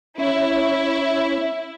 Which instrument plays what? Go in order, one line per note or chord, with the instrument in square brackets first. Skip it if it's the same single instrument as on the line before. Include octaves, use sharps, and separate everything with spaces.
[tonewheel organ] C#4 [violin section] E4